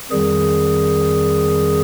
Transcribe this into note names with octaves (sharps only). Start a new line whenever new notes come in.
F2 D#3 G3 G#4